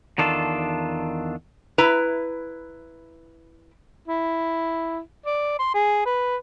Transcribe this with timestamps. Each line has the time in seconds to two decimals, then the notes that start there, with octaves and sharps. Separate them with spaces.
0.18 E2 D#3 D4 F4 A4
1.78 E4 B4 A#5
4.08 E4
5.26 D5
5.59 C6
5.74 G#4
6.05 B4